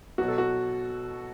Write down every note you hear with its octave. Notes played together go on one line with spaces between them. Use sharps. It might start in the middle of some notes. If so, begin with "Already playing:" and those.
B2 F#3 F#4
A4
F#4